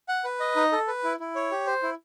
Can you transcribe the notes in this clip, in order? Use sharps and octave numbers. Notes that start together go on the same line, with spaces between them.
F#5
B4
D#5
D#4
A4
B4
E4
E4
C#5
G4
C5
E4